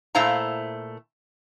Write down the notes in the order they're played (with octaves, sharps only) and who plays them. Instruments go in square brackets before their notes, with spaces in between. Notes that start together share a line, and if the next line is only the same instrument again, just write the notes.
[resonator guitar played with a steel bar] A#2 A3 E4 C5 F5 A#5